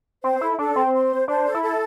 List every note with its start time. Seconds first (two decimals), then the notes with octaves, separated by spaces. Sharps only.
0.23 C4 C5
0.41 E4 A4
0.58 D4 A4
0.76 C4 C6
0.93 C6
1.10 C5
1.28 D4 C5
1.46 A4
1.54 E4
1.62 A4